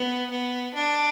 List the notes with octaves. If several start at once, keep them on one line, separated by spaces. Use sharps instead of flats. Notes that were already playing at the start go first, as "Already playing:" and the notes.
Already playing: B3
B3
D4